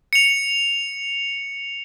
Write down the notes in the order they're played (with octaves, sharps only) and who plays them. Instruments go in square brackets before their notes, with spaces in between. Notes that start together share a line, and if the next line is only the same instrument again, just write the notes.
[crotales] C#7 F7